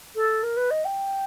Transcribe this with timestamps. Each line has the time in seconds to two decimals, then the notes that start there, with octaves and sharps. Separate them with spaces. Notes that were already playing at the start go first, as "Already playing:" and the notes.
0.16 A4
0.43 A#4
0.57 B4
0.71 D#5
0.85 G5